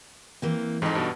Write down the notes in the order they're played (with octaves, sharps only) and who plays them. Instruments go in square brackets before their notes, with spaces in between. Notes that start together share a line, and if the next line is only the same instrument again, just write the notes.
[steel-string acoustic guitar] E3 A#3 C4
[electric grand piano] F2 G#2 [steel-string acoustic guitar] D#4 A4
[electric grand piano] G2 B2